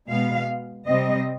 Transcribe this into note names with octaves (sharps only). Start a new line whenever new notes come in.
B2 G#3 B3 F5
C3 G3 C4 D#5